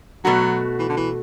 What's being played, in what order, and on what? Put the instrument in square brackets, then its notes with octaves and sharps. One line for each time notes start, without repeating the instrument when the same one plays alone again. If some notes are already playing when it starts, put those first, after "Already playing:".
[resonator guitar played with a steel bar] B2 A3 F#4 [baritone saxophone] F#3
[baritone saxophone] E3
D3
E3